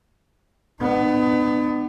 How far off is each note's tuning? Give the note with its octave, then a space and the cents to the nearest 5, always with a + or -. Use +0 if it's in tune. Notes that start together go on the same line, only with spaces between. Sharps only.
B3 +25 D#4 -45